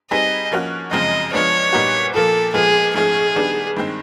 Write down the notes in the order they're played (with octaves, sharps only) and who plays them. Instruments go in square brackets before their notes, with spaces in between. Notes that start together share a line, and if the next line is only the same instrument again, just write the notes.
[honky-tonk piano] G3 C4 D#4 G#4 B4 [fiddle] D#5
[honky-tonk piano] F3 A#3 C#4 F#4
[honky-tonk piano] F#2 C#3 F3 G#3 C4 [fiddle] D#5
[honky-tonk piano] F3 G#3 B3 D4 [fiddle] C#5
[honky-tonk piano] A#2 G3 B3 D#4 F#4
[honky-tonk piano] A#2 F3 A#3 [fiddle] A4
[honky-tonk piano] A#2 F3 G#3 B3 [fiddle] G#4
[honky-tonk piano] G#2 F3 A3 C#4 [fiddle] G#4
[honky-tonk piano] D#3 G3 B3 D4
G2 D#3 G#3 C4